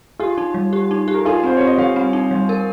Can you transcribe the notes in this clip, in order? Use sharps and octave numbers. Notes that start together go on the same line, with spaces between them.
F4 G4 G#4
D#4
G3
G4
D#4
G4
A#4
D#4 F4 G#4
C4 C5
C4 C#5
D#5
G3 C#5 F5
C4
D#4
G3
A#4